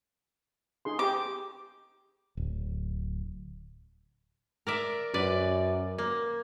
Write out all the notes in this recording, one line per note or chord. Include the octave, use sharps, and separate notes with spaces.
D#4 G#4 C6
G4 D6
D1
A#4 D5 E5
F#2 B4 D5
A#3